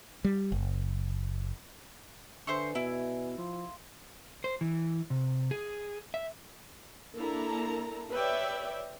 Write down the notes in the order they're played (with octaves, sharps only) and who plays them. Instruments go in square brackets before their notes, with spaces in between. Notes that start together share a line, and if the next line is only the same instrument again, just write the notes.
[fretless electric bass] G3
F#1
[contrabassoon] D3 [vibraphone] B4 D5 G#5 [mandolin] C5 E5 C#6
[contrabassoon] B2 [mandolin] E4
[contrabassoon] F3 [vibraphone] F5 C6
[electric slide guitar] C5
E3
C3
G#4
E5
[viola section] A#3 D4 E4 A4 A5 A#5
G4 B4 C#5 D5 E5 G5